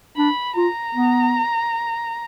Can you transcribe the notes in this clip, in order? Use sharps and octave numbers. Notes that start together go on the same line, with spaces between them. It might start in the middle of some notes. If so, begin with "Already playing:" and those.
D4 B5
F4 A#5
B3